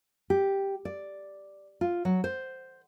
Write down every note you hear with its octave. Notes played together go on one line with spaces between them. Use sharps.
G4
D5
F4
F#3
C5